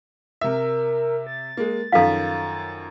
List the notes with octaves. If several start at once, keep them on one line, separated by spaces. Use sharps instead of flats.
C3 A#4 E5
A6
G#3 A#3
F#2 D#3 F3 A4 F5